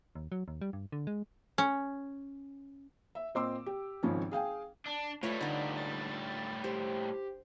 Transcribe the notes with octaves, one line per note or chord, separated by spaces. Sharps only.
D#2
F#3
D#2
G3
G2
D3
G#3
C#4
E5
A#2 C4 D#5 C6 D6 E6
G4
G#1 G#2 C#3 F3 C#4
G#4 F5 G5 G#5
D4
A2 G3 A3 F4 B4 C#5
D3 D#4 D5
A6
G4 C5